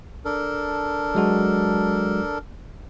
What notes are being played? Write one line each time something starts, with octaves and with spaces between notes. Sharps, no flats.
D4 A4 A#4
F#3 G#3 F#4